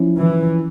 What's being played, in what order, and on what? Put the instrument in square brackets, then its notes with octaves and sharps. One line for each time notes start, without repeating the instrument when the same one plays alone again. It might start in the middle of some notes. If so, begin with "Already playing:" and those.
Already playing: [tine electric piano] F3 C#4 E4
[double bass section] E3